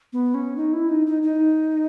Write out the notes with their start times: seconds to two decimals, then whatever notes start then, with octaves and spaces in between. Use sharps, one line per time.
0.13 B3
0.34 C#4
0.57 D#4
0.73 E4
0.89 D#4
1.07 D#4
1.22 D#4